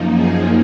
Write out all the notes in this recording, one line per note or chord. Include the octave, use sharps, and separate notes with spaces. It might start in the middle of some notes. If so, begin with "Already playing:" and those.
Already playing: F#2 F3 A#3 D#4
G#4